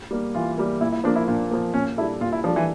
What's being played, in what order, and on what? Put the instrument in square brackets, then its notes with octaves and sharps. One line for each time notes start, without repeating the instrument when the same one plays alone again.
[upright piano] G3 A#3
[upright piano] E3 [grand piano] F4
[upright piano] G3 A#3
[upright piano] A#2 [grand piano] E4
[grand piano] E4
[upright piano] F3 A#3 [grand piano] D4
[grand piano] E4
[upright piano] A#2 [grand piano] D4
[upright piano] F3 A#3
[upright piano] A#2 [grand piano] C#4
[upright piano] G3 D4 A4 [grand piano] E4
[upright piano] A#2 [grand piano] F4
[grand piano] E4
[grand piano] F3 [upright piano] G3 D4 A4
[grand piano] E3